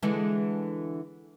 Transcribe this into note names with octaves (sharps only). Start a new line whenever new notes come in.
D3 E3 G#3